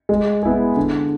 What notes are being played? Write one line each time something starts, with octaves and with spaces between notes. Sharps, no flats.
G#3
B3 E4 G#4
D3